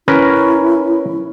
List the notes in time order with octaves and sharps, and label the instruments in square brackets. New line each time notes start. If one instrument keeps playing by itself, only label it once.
[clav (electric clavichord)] C#4 A#4 B4 [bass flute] E4